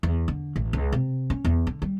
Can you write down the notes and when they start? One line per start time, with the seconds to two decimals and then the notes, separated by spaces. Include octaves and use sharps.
0.03 E2
0.28 D3
0.56 A1
0.73 C#2
0.92 C3
1.30 C#4
1.45 E2
1.67 D3
1.82 G3